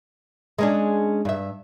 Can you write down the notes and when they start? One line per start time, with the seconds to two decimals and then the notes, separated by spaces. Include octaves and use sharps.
0.59 G#3 C#4 D4
1.25 G2 E5